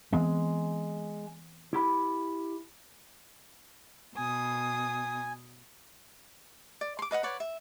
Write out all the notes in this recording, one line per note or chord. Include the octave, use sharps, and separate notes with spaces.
E3 G#3 B3 C4
E4 G4 B5
B2 G#5 D#6
D5
C6 D6
B4 D#5 F5 F#5
B4 C#5 D5 F#5
E5